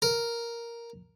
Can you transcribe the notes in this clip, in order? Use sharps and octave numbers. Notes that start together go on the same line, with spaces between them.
A#4